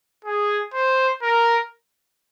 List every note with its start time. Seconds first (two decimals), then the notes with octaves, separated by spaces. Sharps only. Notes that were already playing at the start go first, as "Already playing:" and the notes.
0.25 G#4
0.74 C5
1.22 A#4